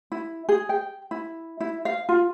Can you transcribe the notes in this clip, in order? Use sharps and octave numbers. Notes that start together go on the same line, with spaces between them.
E4
G#4
G5
E4
E4
F5
F4